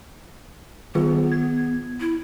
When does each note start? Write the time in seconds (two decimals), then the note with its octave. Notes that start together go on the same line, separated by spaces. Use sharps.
0.95 D#3 B3 F4 G#4
1.32 G#6
2.00 E4